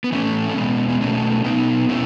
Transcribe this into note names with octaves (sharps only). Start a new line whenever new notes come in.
B3
A2 E3 A3 C#4
A3
B2 G#3 B3
B3
B2 A3 C#4
B2 B3 D#4
B2 C#4 E4